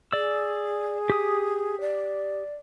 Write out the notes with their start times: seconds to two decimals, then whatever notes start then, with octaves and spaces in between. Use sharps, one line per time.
0.12 G#4 D5 E6
1.10 G4 D#6
1.81 D5